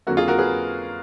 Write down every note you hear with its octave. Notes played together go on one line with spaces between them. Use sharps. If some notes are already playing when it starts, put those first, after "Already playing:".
F2 D3 F#3 A#3 F#4
F4 G#4
F#4 A#4
G#4 B4